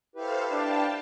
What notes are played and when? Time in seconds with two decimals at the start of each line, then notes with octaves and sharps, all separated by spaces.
0.16 E4 G4 A4 B4 C5 F5
0.51 D4 F5 G5 A5